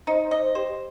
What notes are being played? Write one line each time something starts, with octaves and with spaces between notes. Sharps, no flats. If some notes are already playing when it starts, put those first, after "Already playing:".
D#4 C5
C5
D#5
C5
G4 C5